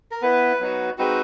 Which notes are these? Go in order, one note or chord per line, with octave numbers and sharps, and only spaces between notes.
A#4
B3 E4 B4
F#3 B3 D#4 F#4
G#3 C4 D#4 F#4 B4